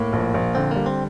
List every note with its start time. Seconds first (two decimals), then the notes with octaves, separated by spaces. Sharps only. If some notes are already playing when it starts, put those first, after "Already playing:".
Already playing: A2 A#3
0.13 A#1
0.34 A#1
0.55 D3 C4
0.71 G3 A#3
0.86 C4